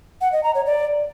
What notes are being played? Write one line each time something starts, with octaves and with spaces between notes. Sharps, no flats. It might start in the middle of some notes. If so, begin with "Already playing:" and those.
F#5
D#5
A#5
C#5
D5